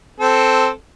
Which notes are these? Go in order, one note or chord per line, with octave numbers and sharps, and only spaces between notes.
C4 A4